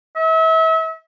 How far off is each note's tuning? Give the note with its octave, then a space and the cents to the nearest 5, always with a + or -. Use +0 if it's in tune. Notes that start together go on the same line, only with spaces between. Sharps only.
E5 -35